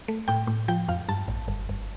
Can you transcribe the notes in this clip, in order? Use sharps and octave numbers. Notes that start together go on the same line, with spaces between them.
A3
A2 G5
A2
F3 G5
F2 F5
G2 A5
A1
G1
G1